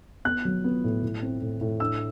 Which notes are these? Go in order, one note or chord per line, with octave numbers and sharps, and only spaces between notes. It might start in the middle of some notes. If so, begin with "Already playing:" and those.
B3 F#6
F#3
B3
A2
A2
C4
A2
A2
D4 E6